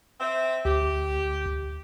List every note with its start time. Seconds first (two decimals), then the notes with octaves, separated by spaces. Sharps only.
0.20 C4 E5
0.65 D2 G4